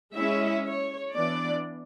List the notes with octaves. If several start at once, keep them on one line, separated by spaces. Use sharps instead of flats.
G#3 C#4 E4 E5
C#5
E3 B3 D4 D5